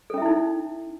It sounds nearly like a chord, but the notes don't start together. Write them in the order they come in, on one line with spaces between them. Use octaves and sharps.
A4 C#4 E5 E4 D#4